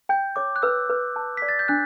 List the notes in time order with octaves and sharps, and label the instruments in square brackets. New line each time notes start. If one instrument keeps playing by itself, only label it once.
[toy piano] G5 [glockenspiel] G6
[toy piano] C#5 [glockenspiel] D6
[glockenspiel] F#6
[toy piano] B4 [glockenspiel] E6
[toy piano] B4
A5
[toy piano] D5 [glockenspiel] B6
[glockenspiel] A6
G6
[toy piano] D4 [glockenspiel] F#6